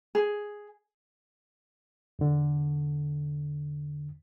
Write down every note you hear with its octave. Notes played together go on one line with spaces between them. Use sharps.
G#4
E2 D3